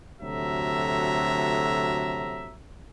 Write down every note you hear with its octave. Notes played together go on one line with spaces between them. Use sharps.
D2 C3 F#3 A4 E5 A#5